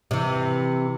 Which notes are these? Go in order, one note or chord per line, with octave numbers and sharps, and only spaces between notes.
C3 E3